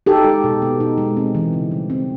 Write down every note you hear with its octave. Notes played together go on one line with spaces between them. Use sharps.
D#4 G4 A4
G#3
B2
B3
D#4
G#3
C4
E3
C#3
G3
C4